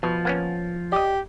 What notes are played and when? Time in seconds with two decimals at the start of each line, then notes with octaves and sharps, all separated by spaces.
0.03 B2 F3
0.25 A#3 B3 C#4
0.92 G4 D5 D#5